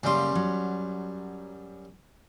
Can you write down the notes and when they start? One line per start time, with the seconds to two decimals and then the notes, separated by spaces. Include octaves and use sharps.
0.03 F#2 C#3 G3 A#3 C6
0.35 F#3